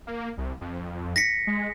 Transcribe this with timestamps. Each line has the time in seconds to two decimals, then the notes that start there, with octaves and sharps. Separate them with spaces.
0.07 A#3
0.38 C2
0.61 F2
1.16 A#6 B6 C#7
1.47 G#3